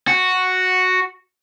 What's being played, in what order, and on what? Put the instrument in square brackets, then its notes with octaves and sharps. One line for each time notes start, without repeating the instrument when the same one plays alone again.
[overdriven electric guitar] F#4